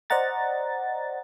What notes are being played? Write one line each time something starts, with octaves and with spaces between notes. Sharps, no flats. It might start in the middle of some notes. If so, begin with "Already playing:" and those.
C5 D5 D#5 F#5 A#5 A6